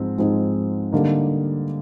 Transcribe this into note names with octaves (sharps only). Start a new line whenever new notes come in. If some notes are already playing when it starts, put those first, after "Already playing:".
Already playing: G#2 F3 G#3 C4 D#4
G#2 F3 G#3 C4 D#4
D3 G3 A#3 D#4